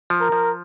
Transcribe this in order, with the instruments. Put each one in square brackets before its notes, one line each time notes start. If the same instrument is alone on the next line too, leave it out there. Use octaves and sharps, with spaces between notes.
[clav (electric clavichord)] F3
[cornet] A#4
[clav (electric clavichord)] F3